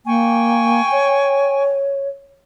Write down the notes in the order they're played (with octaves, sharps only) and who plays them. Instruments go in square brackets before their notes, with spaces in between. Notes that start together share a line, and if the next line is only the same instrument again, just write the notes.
[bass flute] A#3 [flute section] G5 G#5 C#6
[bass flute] C#5